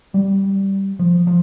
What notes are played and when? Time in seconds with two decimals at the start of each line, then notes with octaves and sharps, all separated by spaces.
0.14 G3
0.99 F3
1.27 F3